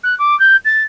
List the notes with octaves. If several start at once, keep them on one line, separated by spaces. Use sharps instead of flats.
F#6
D6
G6
A6